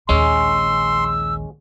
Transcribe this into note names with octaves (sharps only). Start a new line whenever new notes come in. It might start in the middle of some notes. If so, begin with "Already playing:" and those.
A#1 D#2 G#3 C#4 C6 E6